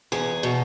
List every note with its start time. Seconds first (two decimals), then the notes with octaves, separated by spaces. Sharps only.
0.12 E2 G#4
0.43 B2